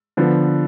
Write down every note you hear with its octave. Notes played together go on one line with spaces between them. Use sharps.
D3 F3 B3